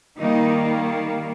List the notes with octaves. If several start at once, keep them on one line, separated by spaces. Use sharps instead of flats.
D#3 G3 A#3 D#4